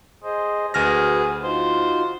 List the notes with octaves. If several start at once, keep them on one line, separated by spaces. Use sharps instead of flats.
G#4 C5 D#5
D2 F#4 G#4 B4 F6 A#6
D#4 F4 F#4 C5